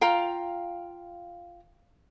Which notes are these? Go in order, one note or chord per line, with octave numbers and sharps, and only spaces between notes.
F4 F5 G5 A#5